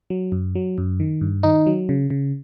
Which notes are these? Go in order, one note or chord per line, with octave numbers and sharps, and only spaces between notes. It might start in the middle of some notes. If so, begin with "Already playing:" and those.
F#3
F#2
F#3
F#2
D#3
G2
D#3 D#4
F#3
C#3
C#3